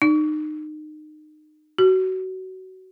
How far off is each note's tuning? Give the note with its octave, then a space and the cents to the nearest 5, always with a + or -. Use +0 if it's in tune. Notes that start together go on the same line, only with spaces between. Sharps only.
D#4 -30
F#4 +25